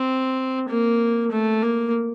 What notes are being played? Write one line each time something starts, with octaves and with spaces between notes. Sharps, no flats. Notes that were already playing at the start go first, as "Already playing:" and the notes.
Already playing: C4
A#3
A3
A#3